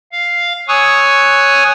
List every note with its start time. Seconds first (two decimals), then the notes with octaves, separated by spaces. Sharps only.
0.12 F5
0.68 C#5 G#5 C#6 D#6 E6 F#6